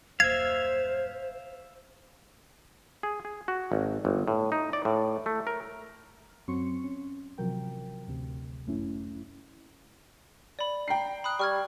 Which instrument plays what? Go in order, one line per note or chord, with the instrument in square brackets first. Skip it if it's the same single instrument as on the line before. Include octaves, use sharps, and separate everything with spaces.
[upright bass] D#1 F#2 [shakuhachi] C5 [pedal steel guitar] E5 F5 [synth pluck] G#6
[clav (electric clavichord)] G#4
G#4
F#4
G#1
G1
A2
D#4
D5
A2
A3
A#4
[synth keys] F#2 F#3 C4 C6 C#6 C#7
C#4
A1 C3 F3 F#3 A#4 G5
A1 D2 C3
G1 F#2 A3 C#4 E4
[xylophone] D5 B5
[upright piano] G5 A#5 C7
[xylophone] B5 D#6 F#6
[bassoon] G3 [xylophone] C#6 F6 G#6